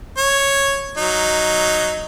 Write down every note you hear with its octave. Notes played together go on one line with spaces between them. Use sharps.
C#5
F#3 D#4